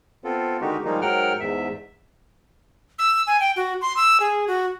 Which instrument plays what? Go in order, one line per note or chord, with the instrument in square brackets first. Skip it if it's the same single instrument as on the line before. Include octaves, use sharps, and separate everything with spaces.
[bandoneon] B3 C4 F4 A4
D3 D#3 G#3 D#4 F#4 G4
D#3 F3 G3 G#3 A#3 D#4
G#2 F#3 A#4 F#5 G5 F6
E2 G#2 E5
[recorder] E6
G#5
G5
F#4
C6
E6
G#4
F#4